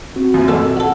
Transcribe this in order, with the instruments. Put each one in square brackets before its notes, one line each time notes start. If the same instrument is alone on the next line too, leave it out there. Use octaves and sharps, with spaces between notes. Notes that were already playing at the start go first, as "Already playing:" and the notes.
[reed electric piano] C4 F#4
[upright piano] F#2 A#2 E3
[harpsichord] F2 F#3 A3 [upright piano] E6
[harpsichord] A1 A4 [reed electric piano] F#5